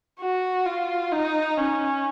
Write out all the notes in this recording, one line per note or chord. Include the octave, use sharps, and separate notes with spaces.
F#4
F4
D#4
C#4